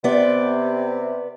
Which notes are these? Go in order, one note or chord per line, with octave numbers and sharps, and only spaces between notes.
C3 B3 D5